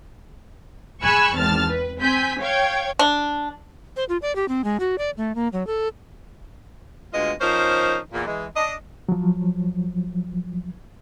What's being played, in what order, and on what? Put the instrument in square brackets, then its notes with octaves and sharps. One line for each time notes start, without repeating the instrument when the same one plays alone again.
[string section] G#4 G#5 B5 C#6 E6 F#6
G#1 E2 C4 A5 F6 A6
B4
C4 G#5 G6 B6
C#5 F5 G5 G#6
[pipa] D4
[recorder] C5
F4
D5
G4
C4
G#3
F#4
D5
A3
A#3
F#3
A4
[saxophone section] D2 G#3 B3 F4 D#5
F3 C#4 D#4 A#4 C5
E2 A#2
E3 G#3
D4 D#5
[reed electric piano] F3 F#3